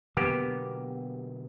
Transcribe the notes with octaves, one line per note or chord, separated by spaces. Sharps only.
B2 D3 F#3 A#3 B3 G4